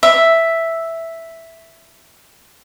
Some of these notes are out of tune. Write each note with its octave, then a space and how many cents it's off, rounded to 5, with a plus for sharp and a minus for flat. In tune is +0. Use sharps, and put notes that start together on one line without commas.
E5 +0